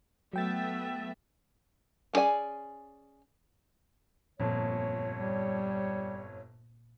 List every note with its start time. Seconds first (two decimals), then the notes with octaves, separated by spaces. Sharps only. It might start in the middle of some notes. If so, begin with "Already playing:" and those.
0.33 F#3 A3 B3 E5 G5 A6
2.13 B3 C#4 G#4 D5 G#5
4.40 G1 F2 A#2 C#5
5.18 G3